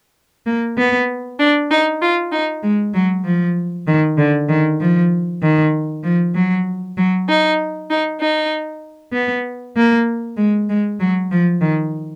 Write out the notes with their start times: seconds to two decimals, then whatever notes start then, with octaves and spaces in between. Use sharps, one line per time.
0.46 A#3
0.77 B3
1.38 D4
1.70 D#4
2.01 F4
2.31 D#4
2.62 G#3
2.94 F#3
3.24 F3
3.87 D#3
4.18 D3
4.48 D#3
4.80 F3
5.42 D#3
6.03 F3
6.34 F#3
6.97 F#3
7.28 D#4
7.89 D#4
8.20 D#4
9.13 B3
9.76 A#3
10.37 G#3
10.68 G#3
10.99 F#3
11.30 F3
11.61 D#3